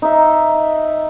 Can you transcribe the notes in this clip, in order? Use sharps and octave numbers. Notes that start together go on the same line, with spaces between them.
D#4 E5